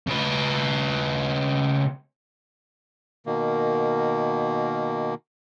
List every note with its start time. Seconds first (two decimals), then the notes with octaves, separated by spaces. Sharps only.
0.07 C#3 B4
3.26 B2 D#3 A#3